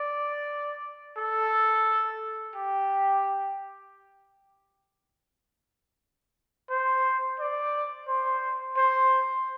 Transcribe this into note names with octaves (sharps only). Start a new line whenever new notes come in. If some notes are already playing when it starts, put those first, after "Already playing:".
Already playing: D5
A4
G4
C5
D5
C5
C5